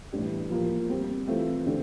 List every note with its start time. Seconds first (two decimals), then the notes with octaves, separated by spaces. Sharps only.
0.12 A2 E3 G3 D4 G4
0.51 F3 A#3 F4
0.89 G3 C4 G4
1.27 E3 A3 C4 F4
1.66 D3 A3 D4 G4